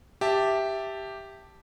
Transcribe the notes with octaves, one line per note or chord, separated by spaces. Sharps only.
G4 E5 A5